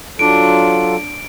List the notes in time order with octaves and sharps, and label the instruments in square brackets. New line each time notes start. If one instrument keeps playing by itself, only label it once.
[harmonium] F#3 F4 A4 [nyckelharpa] D4 [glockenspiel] D7